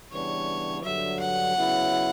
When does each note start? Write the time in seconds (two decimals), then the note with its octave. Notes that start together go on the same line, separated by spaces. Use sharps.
0.12 C#3 E3 G3 B3 D4 C#5
0.83 G2 D3 F#3 E5
1.20 F#5
1.56 C#3 F#3 B3 E4